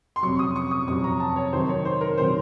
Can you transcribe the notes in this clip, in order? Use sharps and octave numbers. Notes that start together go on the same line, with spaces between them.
C6
F2 C3 F#3 C#6
D#6
C#6
D#6
F2 C3 F#3 C#6
A#5
A5
C#5
C3 D#3 F#3 C5
C#5
C5
A#4
C3 D#3 F#3 C5